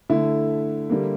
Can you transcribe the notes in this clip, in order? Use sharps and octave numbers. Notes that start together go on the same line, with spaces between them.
D3 A3 E4
D3 G3 A#3